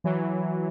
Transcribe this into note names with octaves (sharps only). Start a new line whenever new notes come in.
E3 F#3